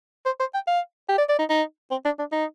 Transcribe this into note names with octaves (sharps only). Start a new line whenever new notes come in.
C5
C5
G5
F5
G4
D5
D5
D#4
D#4
C4
D4
D4
D#4